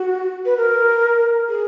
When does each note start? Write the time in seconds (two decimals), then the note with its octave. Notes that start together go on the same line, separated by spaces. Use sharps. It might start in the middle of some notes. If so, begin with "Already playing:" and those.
Already playing: F#4
0.45 B4
0.57 A#4
1.48 G#4